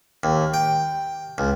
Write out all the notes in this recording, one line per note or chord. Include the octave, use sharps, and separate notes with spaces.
D#2
G5
C#2